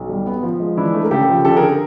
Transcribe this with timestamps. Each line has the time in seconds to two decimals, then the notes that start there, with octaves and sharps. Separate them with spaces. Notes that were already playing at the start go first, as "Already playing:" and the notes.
Already playing: B1
0.09 G3
0.26 B3
0.43 F3
0.60 G#3
0.77 E3 D4 E4
0.94 A3
1.05 A#4
1.11 C#3 G4 A4
1.28 F3
1.45 D3 G4 A4
1.57 G#4 A#4